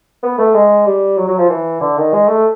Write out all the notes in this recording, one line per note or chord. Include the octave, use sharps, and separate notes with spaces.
B3
A3
G#3
G3
F#3
F#3
F3
E3
D3
D#3
G#3
A3